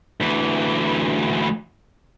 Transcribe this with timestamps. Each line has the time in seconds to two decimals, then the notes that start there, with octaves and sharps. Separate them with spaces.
0.21 D2 E3